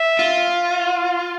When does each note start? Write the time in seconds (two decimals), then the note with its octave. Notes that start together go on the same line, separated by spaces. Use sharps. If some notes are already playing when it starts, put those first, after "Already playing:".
Already playing: E5
0.19 F4